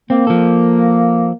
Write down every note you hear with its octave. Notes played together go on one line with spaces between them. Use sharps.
A#3 C4
F3 A4